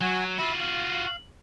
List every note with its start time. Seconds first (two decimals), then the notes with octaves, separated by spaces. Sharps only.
0.01 F#3 F#4 G#5
0.39 F4 F#4 E5 B5
0.61 F5